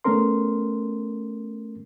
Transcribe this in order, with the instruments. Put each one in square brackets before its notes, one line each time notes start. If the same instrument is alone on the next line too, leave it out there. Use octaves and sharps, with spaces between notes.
[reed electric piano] A3 B3 C#4 A#4 C6